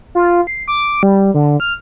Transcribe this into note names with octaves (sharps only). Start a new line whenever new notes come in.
F4
C7
D6
G3
D3
F6